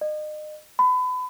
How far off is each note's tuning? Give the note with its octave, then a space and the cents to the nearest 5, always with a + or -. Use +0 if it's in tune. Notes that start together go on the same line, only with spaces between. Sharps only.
D#5 -35
B5 +30